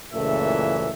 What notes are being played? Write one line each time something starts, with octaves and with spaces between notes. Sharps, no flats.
F#1 C#2 A#2 E3 A3 E5